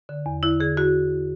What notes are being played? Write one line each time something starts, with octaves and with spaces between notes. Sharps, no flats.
D3
E2
D3 E4
D3 G#4
F#4